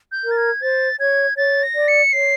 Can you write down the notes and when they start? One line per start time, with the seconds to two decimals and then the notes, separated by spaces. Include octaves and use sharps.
0.12 G6
0.24 A#4
0.31 A6
0.37 G#6
0.62 C5 A6
1.00 C#5 G#6
1.37 C#5 A6
1.63 A#6
1.75 D5
1.88 C#7
2.13 C#5 C7